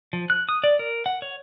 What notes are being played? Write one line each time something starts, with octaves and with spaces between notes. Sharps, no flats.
F3
F#6
D#6
D5
A#4
F#5
C#5